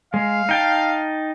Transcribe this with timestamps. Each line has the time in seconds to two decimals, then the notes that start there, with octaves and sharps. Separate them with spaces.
0.14 G#3 F5
0.49 D#4 G5 A5